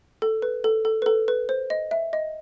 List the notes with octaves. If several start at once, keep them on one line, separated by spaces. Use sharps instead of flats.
A4
B4
A4
A4
B4
A4
B4
C5
D#5
E5
D#5